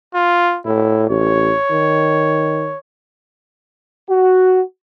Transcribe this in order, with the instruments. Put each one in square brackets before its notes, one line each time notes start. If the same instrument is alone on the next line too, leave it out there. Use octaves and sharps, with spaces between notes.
[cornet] F4
[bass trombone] A2 [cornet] E4
[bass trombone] A1 [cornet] C#5
[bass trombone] D#3
[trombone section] F#4